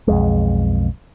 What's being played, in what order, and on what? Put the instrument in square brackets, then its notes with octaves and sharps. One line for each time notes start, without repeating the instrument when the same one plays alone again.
[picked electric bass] B1 F2 G#3